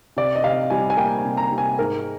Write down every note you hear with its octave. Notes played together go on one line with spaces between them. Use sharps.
C3 D5
D#5
C3 F5
G3 G#5
G#5
A#3 G5
G#5
C3
A#5
C3
G#5
G#2 A#4